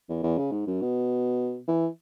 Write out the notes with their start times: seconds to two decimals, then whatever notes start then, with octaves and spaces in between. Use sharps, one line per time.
0.09 E2
0.23 E2
0.38 C#3
0.52 G#2
0.67 F#2
0.81 B2
1.68 E3